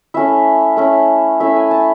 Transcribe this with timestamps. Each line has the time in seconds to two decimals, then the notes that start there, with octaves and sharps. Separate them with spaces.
0.14 A3 C#4 E4 E5
0.77 A3 C#4 E4
1.40 A3 C#4 E4 E5
1.56 G#5
1.71 A5